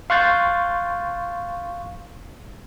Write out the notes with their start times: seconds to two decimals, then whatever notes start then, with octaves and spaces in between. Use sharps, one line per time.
0.10 F5 C6 C#6 F#6 G6 A6